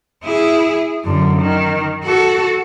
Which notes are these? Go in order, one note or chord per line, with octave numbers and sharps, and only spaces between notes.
E4 G#4
F#2 D3
D#3
F#4 A4